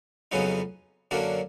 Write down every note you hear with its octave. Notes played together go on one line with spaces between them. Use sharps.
F2 C#3 F#3 B3 D#4
F#2 D3 F#3 A#3 D4